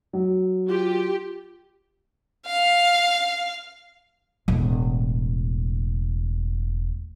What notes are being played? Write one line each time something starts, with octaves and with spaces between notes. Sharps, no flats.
F#3
F4 G4
F5
E1 A2